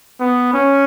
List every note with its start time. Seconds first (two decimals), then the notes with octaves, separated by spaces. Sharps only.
0.20 B3
0.54 C#4